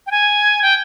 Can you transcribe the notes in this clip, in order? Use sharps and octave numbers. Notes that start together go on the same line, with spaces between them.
G5
G#5
G5